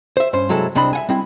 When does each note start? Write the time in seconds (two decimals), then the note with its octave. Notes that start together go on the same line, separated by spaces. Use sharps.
0.17 C5 E5
0.33 G2 C#4 C5
0.49 C3 F#3 G#3 E4 A4
0.75 C2 C3 C4 D4 D#5 B5
0.93 E5 F#5 G#5
1.09 G3 C4 E4